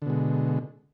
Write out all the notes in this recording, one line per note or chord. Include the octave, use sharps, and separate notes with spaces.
B2 D3 G#3